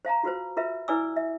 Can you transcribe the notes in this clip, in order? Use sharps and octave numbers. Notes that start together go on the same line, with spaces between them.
C5 F5 A5 A#5
F4 F#4 B4 C5
F4 A#4 B4 E5
E4 B4 D5 G#5 D6 E6
E5